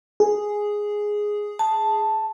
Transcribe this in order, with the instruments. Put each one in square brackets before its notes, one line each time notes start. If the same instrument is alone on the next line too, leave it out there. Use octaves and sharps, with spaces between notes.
[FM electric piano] G#4
[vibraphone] A5